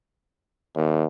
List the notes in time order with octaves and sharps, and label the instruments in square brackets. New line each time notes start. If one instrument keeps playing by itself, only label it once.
[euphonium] D#2